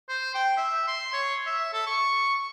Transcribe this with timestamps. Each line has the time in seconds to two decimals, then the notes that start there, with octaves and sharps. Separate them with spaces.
0.09 C5
0.35 G5
0.57 E5
0.88 C6
1.13 C#5
1.46 E5
1.74 A4
1.87 C#6